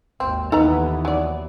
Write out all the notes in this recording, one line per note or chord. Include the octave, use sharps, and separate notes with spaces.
G#1 D#2 C4
D#2 E3 B3 D#4 A4 B4 A#5
F#3 D5